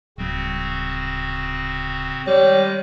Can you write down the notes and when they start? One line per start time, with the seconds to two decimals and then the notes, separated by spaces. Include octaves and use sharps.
0.18 D1 C#3 G3 C4 F#4
2.27 D#3 G3 G#3 C#5